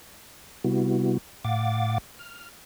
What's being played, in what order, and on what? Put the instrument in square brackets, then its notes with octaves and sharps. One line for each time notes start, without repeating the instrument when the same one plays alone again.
[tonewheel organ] C3 G3 B3 E4 F#4
A2 F5 F#5 D6 A6
F6